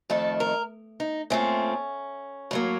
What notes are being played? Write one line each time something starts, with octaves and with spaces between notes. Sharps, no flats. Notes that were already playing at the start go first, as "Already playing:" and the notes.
F2 D#3 A3 A4
A#4
D#4
A#2 A3 C4 C#4
A2 F#3 A#3